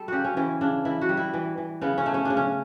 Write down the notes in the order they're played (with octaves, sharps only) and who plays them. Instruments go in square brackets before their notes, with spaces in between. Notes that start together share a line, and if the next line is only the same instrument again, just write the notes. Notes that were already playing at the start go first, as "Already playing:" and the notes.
Already playing: [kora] G3 A4
C#3 F#4 G4
C#4
E3 C#4
C#3 D4
E3 E4
F#4
G3
E4
E3
E3
C#3 B3
C#4
A3
C#4
C#3 D4
C#4